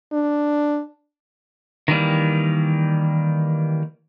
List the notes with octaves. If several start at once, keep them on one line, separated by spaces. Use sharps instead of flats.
D4
D#3 E3 G3 A#3